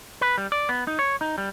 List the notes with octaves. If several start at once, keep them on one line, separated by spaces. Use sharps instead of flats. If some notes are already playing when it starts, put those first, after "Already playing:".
B4
G3
D5
B3
D#4
C#5
D#4
G3